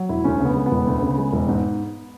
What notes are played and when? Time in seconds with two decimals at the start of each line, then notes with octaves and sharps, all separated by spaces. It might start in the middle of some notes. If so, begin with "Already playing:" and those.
Already playing: F#3
0.09 E1 E4
0.24 D2 C#4
0.40 C#3 B3
0.55 G#3
0.66 E1 B3
0.87 D2
1.02 C#3
1.18 G#3
1.33 E1
1.49 G#2